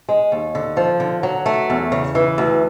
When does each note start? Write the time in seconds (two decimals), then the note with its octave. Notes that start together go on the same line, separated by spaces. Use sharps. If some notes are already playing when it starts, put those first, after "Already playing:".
0.09 G#3
0.32 D#2
0.55 D3
0.77 F3
1.00 D3
1.23 F#3
1.46 A3
1.70 E2
1.92 C#3
2.15 E3
2.38 D2